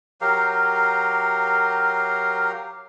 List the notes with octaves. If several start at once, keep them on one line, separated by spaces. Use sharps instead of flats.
F#3 G4 A#4 F5